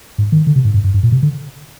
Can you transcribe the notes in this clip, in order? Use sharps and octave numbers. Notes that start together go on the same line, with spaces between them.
G#2
D#3
D3
C3
G#2
G2
G2
G2
A#2
C3
D3